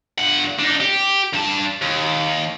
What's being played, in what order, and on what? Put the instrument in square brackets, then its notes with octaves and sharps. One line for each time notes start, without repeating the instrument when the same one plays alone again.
[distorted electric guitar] G2 F#5
D4 D#4
G4
G2 A5
D#2